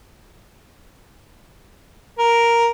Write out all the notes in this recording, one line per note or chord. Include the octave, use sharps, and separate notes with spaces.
A#4